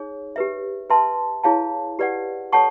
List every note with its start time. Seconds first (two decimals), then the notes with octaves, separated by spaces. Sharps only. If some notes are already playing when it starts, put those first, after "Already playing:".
Already playing: D#4 G#4 C#5
0.36 G4 B4 E5
0.90 B4 E5 A5 C6
1.43 E4 G#4 C#5 F5 A5
1.99 G4 B4 D5 F#5
2.53 A4 C#5 F#5 A5 C#6